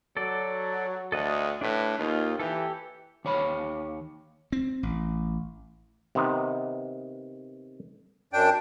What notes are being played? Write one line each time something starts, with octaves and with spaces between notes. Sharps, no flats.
F#3 A4 D5
D2 A4 D#5 F#5
A2 D4 B4
D#2 A#3 D#4 F4
E3 G4 A4
D#2 C#5 B5
C4
A1
C3 D#3 B3
F#2 D4 G5